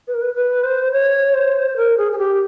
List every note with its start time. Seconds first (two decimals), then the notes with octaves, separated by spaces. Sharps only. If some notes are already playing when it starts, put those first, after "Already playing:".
0.08 B4
0.14 A#4
0.22 B4
0.35 B4
0.64 C5
0.92 C#5
1.34 C5
1.76 A#4
1.98 G#4
2.12 G#4
2.18 G4